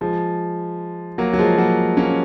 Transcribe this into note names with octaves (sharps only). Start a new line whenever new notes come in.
F3 G#3
F#3 A#3
F#3
F3 G#3
F#3 A#3
A#3 C#4